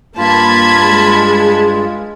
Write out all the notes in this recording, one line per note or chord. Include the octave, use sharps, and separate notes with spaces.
G2 A#3 F4 A5 B5 G#6
G#3